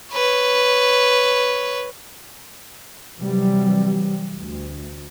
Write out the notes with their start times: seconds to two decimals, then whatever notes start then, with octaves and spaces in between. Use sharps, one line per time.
0.13 B4 C#5
3.17 C3 E3 F#3 G3
4.35 D2